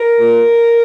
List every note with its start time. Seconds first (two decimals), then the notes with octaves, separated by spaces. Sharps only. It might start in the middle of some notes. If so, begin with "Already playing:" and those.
Already playing: A#4
0.17 A#2